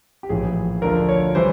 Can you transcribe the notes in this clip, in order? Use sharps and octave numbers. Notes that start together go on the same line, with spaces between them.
G4
A#1 A2 E3 G#4
D2 D3 F3 A#4
C#5
E3 G3 C5